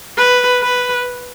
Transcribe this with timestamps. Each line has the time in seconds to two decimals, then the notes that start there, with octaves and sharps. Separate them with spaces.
0.18 B4
0.62 B4